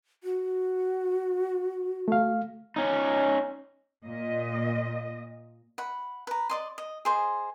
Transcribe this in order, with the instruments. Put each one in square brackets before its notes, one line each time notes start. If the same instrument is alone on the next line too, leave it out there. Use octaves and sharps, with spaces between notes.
[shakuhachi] F#4
[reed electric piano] A3 F5
[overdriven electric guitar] C#4 D#4
[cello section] A#2 D#5
[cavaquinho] F#5 B5
B4 A#5
D5 D#5 C6
D#5
G#4 C5 D#5